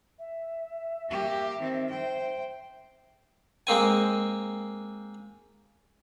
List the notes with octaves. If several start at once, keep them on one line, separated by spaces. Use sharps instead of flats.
E5
A#3 G4
D#3 C4
C5 G5
G#3 A#3 C4 G#5